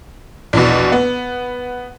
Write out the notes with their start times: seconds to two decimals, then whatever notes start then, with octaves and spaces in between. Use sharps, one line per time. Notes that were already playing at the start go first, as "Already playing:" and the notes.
0.53 A#1 E2 B2
0.92 B3